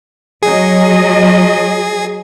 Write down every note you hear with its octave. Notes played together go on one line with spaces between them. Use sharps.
F#3 G#4 D#5